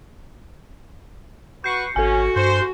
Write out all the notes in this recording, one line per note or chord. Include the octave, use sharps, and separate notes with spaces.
F#4 B4 C#6 G6 C7 C#7
G#1 C#4 F#4 A4 G#5
G2 C5